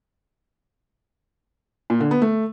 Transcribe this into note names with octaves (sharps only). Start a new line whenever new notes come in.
A#2
D3
B3
A3